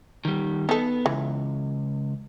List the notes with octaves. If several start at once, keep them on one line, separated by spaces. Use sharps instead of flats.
D#3 G3
B3 D#4 A4
C#2 E3